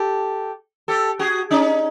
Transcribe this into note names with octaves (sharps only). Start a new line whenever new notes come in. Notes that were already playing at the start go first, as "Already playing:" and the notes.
Already playing: G4 A4
G4 A4
F#4 G#4
C#4 D#4